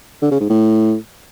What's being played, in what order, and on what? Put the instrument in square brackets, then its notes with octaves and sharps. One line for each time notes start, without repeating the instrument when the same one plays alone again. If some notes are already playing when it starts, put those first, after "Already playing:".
[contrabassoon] D3
C#3
G#2
A2